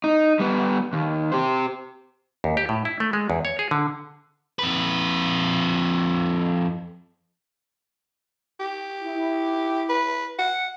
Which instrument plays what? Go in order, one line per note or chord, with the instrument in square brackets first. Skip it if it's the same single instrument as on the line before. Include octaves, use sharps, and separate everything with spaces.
[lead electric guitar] D#4
G3 B3
D#2
G4 C5
[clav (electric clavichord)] D#2
G4
A2
E4
A3
G#3
E2
C#5
G#4
D3
[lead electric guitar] F2 B4
[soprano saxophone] G4
[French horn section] E4
[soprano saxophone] B4
F#5